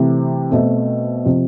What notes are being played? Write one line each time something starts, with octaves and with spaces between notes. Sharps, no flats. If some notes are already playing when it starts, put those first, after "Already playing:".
Already playing: C3 E3 A3 E4 G4
B2 A3 C4
C3 F3